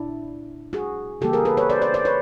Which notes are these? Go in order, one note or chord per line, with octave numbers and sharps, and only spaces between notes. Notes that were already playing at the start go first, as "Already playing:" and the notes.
Already playing: A#2 D4 E4
F#4 G#4
C#3 E3 G3 A#3 G4 A4
G#4 A#4
A4 B4
B4 C#5
C5 D5
C5 D5
C5 D5
B4 C#5